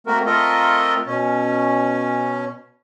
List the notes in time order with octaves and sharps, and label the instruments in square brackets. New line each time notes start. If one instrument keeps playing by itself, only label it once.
[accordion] A3 A#3 C4 F#4 A#4
A3 C4 F4 A4 A#4 D#5
B2 C#4